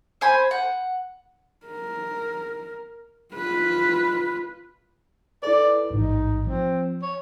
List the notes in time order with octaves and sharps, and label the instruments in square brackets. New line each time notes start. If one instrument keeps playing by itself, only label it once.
[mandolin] C5 G#5 B5
F#5
[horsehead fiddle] A#4
F4 B4
[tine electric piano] E4 A4 B4 [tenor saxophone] D5
[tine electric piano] A1 G#2 E3 [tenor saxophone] D#4
[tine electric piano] F3 [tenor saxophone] C4
[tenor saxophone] C#5